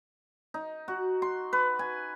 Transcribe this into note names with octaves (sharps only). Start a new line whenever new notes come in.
D#4
F#4
C6
B4
G#5